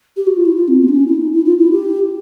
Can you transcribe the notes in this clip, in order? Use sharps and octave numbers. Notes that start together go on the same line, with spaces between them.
G4
F#4
F4
E4
F4
C4
B3
D4
C#4
E4
D#4
E4
F4
E4
G4